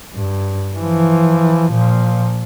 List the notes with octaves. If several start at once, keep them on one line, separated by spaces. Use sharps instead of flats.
G2
E3 F3
A#2 F3